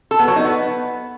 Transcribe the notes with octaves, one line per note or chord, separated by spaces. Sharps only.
A4
B3
F#3
D#4
B3